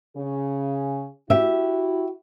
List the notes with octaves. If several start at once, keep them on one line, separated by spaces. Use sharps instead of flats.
C#3 G#4
E4 F#4 G4 E5